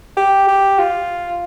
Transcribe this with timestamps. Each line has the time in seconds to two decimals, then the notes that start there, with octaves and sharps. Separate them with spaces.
0.17 G4
0.48 G4
0.78 F4